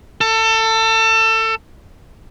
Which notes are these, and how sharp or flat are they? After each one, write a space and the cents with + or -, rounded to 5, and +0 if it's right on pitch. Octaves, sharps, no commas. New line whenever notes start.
A4 +25